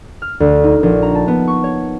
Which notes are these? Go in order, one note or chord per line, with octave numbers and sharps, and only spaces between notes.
F6
D2
D#4
A#1
A#5
A5
B3
C#6
C#5